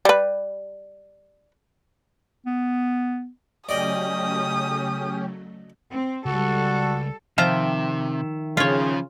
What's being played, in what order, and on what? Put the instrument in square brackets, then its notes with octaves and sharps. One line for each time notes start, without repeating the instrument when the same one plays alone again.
[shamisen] G3 B4
[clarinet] B3
[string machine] C#3 F#3 A3 [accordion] C#4 G4 [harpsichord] D5 D#5 [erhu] D#6
[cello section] C4
[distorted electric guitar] C#2 [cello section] G3 A4 [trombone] F#4
[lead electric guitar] C3 [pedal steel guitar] D#3 E5 G5 [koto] F3 F4 A#5
[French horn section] C#3 [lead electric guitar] F3 [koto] F4 C#5